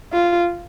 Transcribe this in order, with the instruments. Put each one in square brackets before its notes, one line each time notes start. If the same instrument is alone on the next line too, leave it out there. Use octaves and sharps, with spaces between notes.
[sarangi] F4